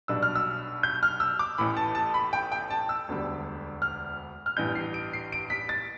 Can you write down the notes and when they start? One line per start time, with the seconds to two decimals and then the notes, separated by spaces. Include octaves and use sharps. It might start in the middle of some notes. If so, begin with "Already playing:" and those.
0.08 B1 B2 G3 D4 E6
0.23 F6
0.35 E6
0.83 G6
1.03 F6
1.20 E6
1.39 D6
1.58 A1 A2 E3 B5
1.77 A5
1.95 A5
2.14 B5
2.33 G5
2.52 G5
2.70 A5
2.89 E6
3.08 E1 D2 D3 G3
3.82 F6
4.46 F6
4.57 A1 G2 E3 B3 D4 G6
4.75 C7
4.94 D7
5.13 C7
5.32 D7
5.50 B6
5.69 A6